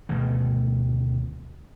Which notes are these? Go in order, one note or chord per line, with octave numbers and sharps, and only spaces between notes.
D2 B2 D#3 A3